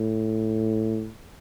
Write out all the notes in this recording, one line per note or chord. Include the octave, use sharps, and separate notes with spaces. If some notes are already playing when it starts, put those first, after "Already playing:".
Already playing: A2